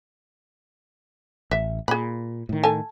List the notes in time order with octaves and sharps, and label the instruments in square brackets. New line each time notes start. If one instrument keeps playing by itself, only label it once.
[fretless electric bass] A1 [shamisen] E5
[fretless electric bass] A#2 [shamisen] G#4 B5
[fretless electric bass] A2 D#3
[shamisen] A4 G#5 A5